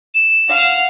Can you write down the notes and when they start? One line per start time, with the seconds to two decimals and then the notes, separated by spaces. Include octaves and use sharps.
0.14 E7
0.48 F5 F#5